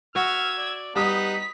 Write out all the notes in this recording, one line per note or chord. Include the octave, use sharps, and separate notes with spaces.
F#4 E5 E6 F6 G#6
D5
G3 B3 D#4 F#5 D#6 B6